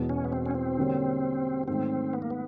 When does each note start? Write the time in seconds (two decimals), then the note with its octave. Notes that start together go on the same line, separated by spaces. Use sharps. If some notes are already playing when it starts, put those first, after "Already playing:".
Already playing: E1 E2 B2
0.09 C#4
0.25 B3
0.32 C4
0.46 C#4
0.55 C4
0.78 D3 G3 A#3 C#4
1.68 G#2 D#3 F#3 A3 C4 C#4
2.13 B3
2.22 A#3
2.30 B3